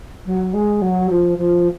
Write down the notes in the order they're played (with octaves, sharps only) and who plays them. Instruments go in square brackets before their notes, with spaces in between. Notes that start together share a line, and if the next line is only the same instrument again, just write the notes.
[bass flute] F#3
G#3
F#3
F3
F3